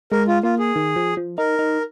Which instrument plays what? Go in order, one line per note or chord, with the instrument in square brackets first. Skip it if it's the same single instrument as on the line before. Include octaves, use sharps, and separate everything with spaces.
[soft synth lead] G#3 [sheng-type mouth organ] A#4
[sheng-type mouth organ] F4
[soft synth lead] A#3 [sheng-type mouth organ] F4
[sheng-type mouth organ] G#4
[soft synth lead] D#3
F3
F3
[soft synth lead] D#4 [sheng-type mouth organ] A#4
[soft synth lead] D#4